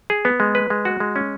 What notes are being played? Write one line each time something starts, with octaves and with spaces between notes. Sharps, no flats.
G#4
B3
G#3
B4
G#3
F#4
G#3
C#4